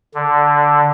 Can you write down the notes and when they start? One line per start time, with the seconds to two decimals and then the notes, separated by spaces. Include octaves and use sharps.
0.15 D3